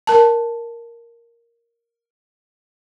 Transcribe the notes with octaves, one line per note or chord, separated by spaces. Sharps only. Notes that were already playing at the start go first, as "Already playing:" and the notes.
A#4 A5